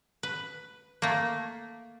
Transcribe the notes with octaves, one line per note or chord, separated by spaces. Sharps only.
B4
A3 A#3